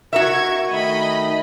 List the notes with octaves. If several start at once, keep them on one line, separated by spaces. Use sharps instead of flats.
F#4 A#4 E5 C#6 G#6
D#3 A3 D#5 B5